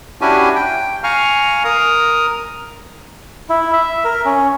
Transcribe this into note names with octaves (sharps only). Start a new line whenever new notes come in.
C#4 D4 E4 F#4 G4 G#5
G5
F5 G#5 A#5 C#6 F6
A#4 A#5 D#6
E4
E5
A#4
C#4